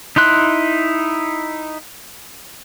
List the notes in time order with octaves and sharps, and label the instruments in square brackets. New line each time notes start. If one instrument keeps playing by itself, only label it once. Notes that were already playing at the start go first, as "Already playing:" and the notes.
[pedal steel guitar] D#4 E4 C6 F#6